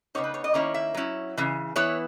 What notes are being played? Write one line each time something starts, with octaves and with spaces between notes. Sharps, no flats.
C#3 E3 B3 D#4 C#5
B4
C#5
D#5
D#3 A#3 C#4 E4 C#5
E5
F#3 C#4 E4
C#3 E3
E3 B3 E4 C#5